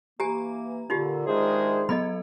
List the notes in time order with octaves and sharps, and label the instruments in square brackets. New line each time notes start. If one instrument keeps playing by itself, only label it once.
[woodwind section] E3 A#3 [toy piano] G4 G#5 [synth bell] A#5
[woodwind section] A#2 D3 [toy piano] D#4 F4 G4
[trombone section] D#3 G#3 C5 [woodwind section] D4 E4 G#4
[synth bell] F#3 B3 A4 [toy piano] D#5 B5